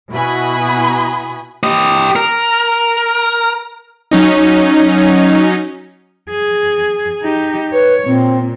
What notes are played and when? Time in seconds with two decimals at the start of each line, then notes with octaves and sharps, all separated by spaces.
0.11 B2 E4 F#4 G#5 B5 D#6
1.63 G4 D#5
2.16 A#4
4.11 F#3 C#4 D#4
6.30 G#4
7.23 D#4 G4
7.73 B4 C#5
8.06 A#2 C4